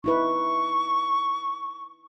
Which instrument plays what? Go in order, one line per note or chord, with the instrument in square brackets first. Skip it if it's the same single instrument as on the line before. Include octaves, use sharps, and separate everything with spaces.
[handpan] D#4 E4 B4 [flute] C#6